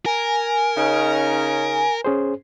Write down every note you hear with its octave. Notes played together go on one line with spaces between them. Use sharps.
A#4 G#5
C#3 C#4 D#4
C#4 G#4 C5